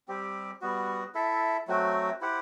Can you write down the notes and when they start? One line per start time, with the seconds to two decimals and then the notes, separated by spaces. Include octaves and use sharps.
0.08 G3 C4 G4
0.61 G3 B3 F#4
1.15 E4 A4 E5
1.67 F#3 A3 C4 F#4
2.21 E4 G4 C5 F#5